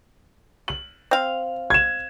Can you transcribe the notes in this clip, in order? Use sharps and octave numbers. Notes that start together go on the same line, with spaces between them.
F#7
C4 F5
G#6 E7